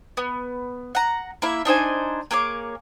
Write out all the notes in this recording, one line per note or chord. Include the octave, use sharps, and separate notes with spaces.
B3
F#5 A#5
A#3 E4 E5
D4 D#4 C5 G#5
A#3 G#4 C#5 D6